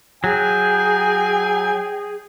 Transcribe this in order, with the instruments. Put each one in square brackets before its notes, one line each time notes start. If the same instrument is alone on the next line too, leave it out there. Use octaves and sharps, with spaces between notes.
[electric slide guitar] F#3 [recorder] G#4 [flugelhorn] G5 [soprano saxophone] G#5